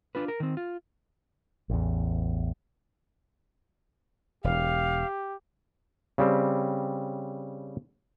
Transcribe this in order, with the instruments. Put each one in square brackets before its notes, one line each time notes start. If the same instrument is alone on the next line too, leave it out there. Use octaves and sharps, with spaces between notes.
[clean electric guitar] D4 F4 B4
A#4
D#3 C4
F4
[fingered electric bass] A1 E2
[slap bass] E1 [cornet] G4 [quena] F5
[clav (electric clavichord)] C#3 G3 C4